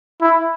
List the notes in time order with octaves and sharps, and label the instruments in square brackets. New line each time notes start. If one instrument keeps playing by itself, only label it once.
[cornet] E4